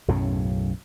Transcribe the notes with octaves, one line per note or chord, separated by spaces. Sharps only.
B1 F#2 A2 C#3